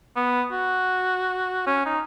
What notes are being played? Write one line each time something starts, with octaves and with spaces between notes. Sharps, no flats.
B3
F#4
C#4
D#4